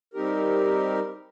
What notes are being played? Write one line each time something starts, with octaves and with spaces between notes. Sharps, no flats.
G3 C4 D#4 G4 A#4